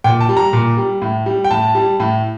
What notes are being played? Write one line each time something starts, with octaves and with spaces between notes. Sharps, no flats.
A#2 G5
A5
G3
A#5
A#2
G3
A2
G3
G5
A2 A5
G3
A2